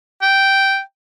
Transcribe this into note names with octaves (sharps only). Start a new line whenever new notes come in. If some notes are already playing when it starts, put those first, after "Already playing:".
G5